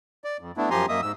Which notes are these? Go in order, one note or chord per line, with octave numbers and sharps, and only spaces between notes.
D5
F2
A3 B3 D4 E4
F#2 F3 G4 G#5 A#5 C6
F#2 A#3 D#5 E5 D#6
G#2 E6